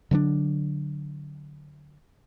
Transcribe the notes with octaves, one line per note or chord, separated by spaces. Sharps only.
D3 F#3 G#3 D4